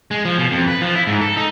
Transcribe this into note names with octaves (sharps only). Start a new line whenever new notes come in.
G#3
F3
B2
F2
B4
F3
E4
G#2
A4
D#4